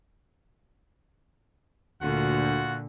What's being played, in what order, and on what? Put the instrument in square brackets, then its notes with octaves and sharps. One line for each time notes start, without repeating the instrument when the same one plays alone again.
[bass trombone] D2 [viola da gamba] A#2 D3 [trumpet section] F4 F#4 F#5